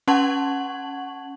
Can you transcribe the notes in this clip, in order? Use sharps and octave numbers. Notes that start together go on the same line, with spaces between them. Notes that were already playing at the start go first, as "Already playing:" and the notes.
C#4 F#5 A5 C#6 G#6 F#7